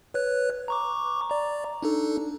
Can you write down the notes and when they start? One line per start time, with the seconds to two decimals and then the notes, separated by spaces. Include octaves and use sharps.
0.14 B4 C#5 F#6
0.68 A#5 C#6 D6
1.30 D5 A#5
1.83 D4 D#4 A4